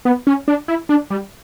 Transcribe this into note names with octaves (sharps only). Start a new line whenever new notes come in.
B3
C#4
D4
E4
D4
G3